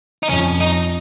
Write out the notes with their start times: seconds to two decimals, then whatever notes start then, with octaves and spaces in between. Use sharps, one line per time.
0.23 D#4
0.29 F2 C#4
0.60 D#4